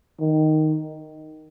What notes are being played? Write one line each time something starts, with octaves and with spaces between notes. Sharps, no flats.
D#3